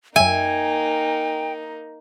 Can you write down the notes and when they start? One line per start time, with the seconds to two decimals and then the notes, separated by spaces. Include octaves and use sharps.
0.16 F#2 A#3 D#4 E5 G5 G#5